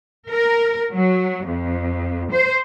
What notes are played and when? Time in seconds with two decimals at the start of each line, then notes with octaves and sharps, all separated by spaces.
0.28 A#4
0.91 F#3
1.46 F2
2.31 C5